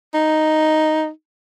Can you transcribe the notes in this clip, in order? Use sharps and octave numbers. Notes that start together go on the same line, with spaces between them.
D#4